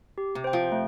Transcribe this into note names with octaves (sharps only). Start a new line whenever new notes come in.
G4
C3
C5 G5
F3
A3